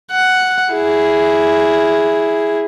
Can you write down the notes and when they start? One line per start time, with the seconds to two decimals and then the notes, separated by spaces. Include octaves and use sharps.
0.11 F#5
0.73 E4 G#4